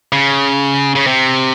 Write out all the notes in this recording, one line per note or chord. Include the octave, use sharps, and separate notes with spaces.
C#3
C#3
C3